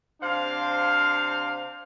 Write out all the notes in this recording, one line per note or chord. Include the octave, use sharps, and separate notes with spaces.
C3 D4 C5 F5